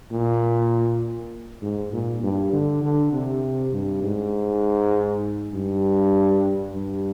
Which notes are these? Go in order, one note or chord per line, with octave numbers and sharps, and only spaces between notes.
A#2
G#2
A#2
G2
D3
D3
C3
G2
G#2
G2
G2